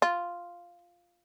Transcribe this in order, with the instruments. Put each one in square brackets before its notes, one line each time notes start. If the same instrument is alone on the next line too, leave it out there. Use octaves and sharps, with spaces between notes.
[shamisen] F4